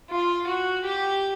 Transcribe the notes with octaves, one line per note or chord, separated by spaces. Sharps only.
F4
F#4
G4